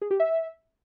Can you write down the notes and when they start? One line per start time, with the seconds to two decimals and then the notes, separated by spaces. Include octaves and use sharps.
0.02 G#4
0.11 G4
0.20 E5